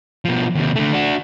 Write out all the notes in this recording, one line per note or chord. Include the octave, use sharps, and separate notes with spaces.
B2 F3
D#2 C3
D3 A3
D4 F#4